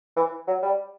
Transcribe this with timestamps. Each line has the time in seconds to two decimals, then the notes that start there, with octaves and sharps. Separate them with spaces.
0.16 E3
0.47 F#3
0.62 G3